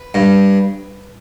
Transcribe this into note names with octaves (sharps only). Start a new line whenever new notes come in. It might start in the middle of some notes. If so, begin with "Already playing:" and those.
Already playing: B4
G2